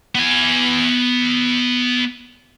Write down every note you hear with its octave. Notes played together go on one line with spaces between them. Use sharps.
B3 G#5